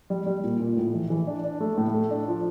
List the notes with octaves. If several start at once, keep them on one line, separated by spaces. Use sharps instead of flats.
G3
G3
A#2
A#2
A2
E3
E3
D4
D4
A3
A2
A3
D4
F3